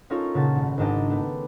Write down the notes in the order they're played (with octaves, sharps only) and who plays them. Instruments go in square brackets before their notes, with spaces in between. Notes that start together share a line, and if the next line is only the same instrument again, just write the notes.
[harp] C#4 D#4 F4 A4 A#4 C#5
A#2 C#3 F#4 A5 A6
G#1
G#1 G#2 D4 A#4 D#5 G5
A3 B3 D4